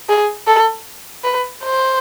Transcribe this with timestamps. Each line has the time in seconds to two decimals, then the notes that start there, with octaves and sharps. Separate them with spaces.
0.09 G#4
0.47 A4
1.24 B4
1.63 C5